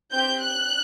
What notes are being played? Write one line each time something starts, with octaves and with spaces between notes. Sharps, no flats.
C4 G4 G6
F#6